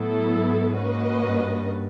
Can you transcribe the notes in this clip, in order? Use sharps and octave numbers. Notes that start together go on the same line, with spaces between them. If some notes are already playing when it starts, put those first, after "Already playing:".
Already playing: A2 F#3 B3 E4 A4
G#2
A#3 C#4 F#4 B4 D#5
G2